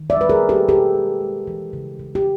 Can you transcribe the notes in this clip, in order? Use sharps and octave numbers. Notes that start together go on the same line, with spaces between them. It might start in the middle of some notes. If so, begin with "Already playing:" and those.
Already playing: D#3
D5 E5
G3 B4
G#4 A#4
A#3
G4 A4
B2 G4 A4
G#3
G#3
E3
C#3
C#3
G4